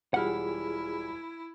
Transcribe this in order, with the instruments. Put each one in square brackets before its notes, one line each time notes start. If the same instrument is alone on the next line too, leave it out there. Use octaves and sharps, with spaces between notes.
[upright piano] E1 G3 F6 [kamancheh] E4 [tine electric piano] F4 G#4 [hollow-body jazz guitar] F#5